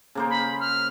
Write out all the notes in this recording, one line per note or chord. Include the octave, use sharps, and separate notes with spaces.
C#3 A#3 C5
B5
F6